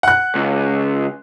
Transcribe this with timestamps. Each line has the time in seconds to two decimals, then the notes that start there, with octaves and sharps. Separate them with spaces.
0.03 F#5 F#6
0.35 C#2